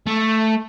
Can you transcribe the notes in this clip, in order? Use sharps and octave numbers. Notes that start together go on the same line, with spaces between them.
A3